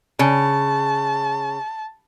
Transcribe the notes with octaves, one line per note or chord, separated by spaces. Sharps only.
C#3 A5